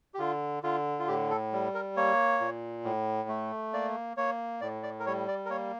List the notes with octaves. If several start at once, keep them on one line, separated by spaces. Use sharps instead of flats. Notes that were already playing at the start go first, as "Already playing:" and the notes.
G4
D3 F4
D3 F4
F4
A2 G4
A4
G3
A#4
A#3 C#5
A#2
A2
A3
A#3 D5
A#3 C#5
A2 D5
D5
A#4
G3 C#5
D5
A#4
A#3 C#5